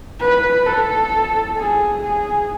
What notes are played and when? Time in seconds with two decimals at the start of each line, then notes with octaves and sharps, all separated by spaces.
0.21 B4
0.66 A4
1.58 G#4
2.04 G#4